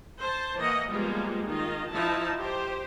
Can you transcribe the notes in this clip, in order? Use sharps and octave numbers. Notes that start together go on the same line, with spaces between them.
C5 A5
E3 A#3 D#5 F#5
F3 G3 G#3 A#3 B3 F4
D#3 F4 D#5
F3 D#4 E4 A5
G4 C5